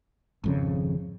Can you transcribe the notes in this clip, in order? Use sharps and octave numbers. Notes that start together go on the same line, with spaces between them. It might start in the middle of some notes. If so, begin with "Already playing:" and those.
G#1 F2 C#3